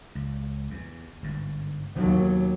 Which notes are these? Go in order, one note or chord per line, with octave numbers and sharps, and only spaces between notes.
C#2
E2
G1 G#2
D#2 B2 E3 F#3 B3